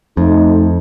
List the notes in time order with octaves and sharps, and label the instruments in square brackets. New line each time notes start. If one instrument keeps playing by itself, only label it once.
[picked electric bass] F2 [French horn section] A3 D#4